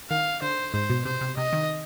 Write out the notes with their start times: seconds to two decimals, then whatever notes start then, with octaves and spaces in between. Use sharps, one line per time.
0.10 D#3 F5
0.42 D3 C5
0.74 G#2 C5
0.90 B2
1.05 C3 C5
1.21 C3
1.37 C3 D#5
1.52 D#3